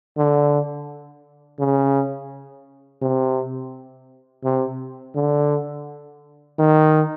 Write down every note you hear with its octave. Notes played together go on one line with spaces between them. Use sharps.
D3
C#3
C3
C3
D3
D#3